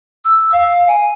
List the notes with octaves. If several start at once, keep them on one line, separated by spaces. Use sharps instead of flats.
E6
F5
G#5